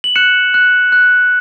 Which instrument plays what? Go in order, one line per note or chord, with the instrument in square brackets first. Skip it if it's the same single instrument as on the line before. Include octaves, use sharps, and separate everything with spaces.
[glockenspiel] F#7
F#6 C#7 E7
F#6
F#6